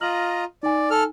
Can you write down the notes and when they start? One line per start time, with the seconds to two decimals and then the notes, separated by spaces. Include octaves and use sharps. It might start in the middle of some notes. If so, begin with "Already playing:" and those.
0.01 F4 D#5 A#5 F6 F#7
0.63 D#4 D5 G#5
0.91 A4 F6